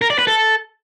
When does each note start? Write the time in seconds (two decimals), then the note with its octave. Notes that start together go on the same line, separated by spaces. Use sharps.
0.02 A#4
0.10 D5
0.19 B4
0.27 A4